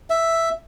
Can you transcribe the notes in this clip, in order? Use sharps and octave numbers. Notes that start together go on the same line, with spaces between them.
E5